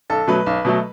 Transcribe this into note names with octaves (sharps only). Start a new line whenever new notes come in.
B1 A4
B2 F#3 A3 B4
B1
B2 F#3 A3